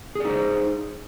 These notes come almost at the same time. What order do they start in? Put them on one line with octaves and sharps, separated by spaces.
G#4 D5 D#4 C5